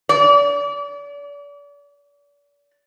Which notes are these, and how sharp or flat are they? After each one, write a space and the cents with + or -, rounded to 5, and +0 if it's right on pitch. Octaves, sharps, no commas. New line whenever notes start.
D5 -40